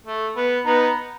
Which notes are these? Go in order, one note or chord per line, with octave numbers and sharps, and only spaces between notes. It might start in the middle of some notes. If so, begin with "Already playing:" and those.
A3
B3
B3 D#4